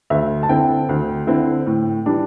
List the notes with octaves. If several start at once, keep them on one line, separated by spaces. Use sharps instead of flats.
D2 E5
A5
D3 C4 E4 G5
D2
D3 C4 E4
A2
E3 G3 D4